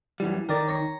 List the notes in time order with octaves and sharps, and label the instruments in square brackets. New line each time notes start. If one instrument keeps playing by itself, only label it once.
[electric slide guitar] F#2 E3 G3
[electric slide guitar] D#3 [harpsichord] A#4 D5 A#5
[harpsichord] C#5 A#5 C#6